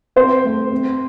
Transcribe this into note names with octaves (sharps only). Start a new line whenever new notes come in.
C4 C5
A3
C4